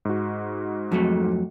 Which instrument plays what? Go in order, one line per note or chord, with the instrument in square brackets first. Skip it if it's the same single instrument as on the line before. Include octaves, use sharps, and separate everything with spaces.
[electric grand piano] G#2 F#4
[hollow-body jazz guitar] F2 F#3 A3